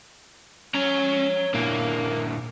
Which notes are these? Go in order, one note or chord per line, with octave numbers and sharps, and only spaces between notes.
C#4 C#5 A#5
A#2 A#3 D4 E4